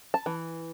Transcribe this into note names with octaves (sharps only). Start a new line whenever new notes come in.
A5
E3